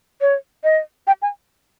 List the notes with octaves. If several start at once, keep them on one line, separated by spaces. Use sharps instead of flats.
C#5
D#5
G5
G#5